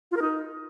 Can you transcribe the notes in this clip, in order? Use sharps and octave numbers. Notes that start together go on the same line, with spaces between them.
F4
A#4
D#4